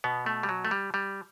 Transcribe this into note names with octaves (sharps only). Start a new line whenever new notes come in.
B2 B3
A3
G3
F#3
A3
G3
G3